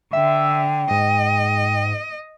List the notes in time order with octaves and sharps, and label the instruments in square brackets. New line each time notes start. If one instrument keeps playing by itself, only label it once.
[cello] D3 [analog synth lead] E5 [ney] G5
[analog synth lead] G#2 [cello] D#5